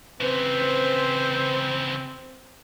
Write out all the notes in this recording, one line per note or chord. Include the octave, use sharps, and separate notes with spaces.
C#3 E3 C4 B4 C5